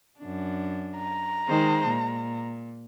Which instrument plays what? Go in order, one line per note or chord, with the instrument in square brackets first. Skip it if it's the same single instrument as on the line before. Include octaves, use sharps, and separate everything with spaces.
[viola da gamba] F#2 D4
[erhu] A#5
[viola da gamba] D#3 G#3 C5
A#2